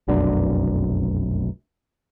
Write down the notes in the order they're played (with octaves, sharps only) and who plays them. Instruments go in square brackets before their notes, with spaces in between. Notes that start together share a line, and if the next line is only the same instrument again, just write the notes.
[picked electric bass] F1 B1 F#2 D4